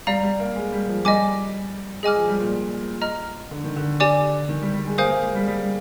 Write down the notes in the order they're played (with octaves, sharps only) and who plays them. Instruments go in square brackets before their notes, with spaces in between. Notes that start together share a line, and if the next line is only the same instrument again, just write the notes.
[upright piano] G3 [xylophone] D5 F5 A#5
[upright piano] G3
A#3
G#3
G3
F3
[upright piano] G3 [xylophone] D#5 G#5 D6
[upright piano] G#3 [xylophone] G#4 D#5 G#5 D6 F6
[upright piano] F3
G3
A#2
[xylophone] D#5 A#5 F6
[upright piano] D3
D#3
D3
[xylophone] G4 D5 G#5 D6
[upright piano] D#3
G3
G3
G#3
[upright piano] A#3 [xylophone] C5 F5 G#5 D#6 G6
[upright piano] A#3
G#3
G3
G3